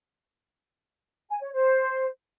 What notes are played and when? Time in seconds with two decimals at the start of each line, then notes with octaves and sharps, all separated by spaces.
1.29 G#5
1.40 C#5
1.52 C5